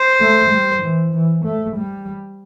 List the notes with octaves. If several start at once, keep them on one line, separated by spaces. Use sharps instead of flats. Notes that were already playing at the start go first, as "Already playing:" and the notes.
Already playing: C5
A3
G3
E3
E3
A3
G3